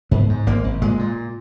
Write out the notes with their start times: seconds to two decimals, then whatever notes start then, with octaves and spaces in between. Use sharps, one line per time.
0.11 G#2 B3
0.29 G#2
0.47 G#1 A#3
0.64 G#1
0.82 A#2 G#3
0.99 A#2